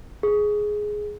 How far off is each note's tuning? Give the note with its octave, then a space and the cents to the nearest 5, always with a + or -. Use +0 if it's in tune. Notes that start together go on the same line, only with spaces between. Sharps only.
G#4 +10